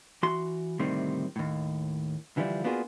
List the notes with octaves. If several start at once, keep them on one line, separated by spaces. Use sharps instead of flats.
E3 F#4 C6
D2 A2 C3 D#3 G3 C4
D#2 A2
D3 E3 F3 G3 D4
A#3 B3 D4 F4 F#4 G#4